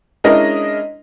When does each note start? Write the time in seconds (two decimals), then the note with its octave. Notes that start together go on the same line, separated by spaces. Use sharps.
0.24 G#3 C#4 D4 E4 A#4 D#5